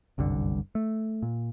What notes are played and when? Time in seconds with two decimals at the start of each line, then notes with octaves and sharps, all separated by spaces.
0.18 F#1 C2 G2 D3
0.75 A3
1.22 A#2